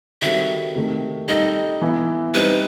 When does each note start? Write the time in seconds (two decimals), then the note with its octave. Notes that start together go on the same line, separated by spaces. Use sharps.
0.22 D#3 G3 C4 F#4 A4 E5
0.75 C3 D#3 A3
1.28 G3 D#4 A4 D#5
1.82 E3 B3 E4
2.34 G3 C4 D#4 B4